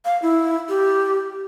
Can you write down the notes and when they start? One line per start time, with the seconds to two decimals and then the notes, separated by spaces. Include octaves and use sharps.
0.05 F5
0.22 E4
0.69 G4